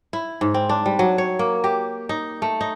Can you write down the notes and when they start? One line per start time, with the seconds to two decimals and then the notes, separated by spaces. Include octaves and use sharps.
0.13 E4
0.41 G#2
0.54 C4
0.69 D4
0.86 G3
0.99 F#3
1.18 C#5
1.39 A#3
1.64 G4
2.09 D#4
2.42 A3
2.61 D#4